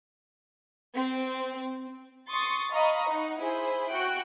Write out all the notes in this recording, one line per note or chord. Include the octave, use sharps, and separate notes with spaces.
C4
C6 C#6 D#6 A6 C#7
D#5 F5 A#5 B5 C#6 D#6
D#4 F#5
E4 G#4 C5 B5
F#4 G5 F#6 C#7 D7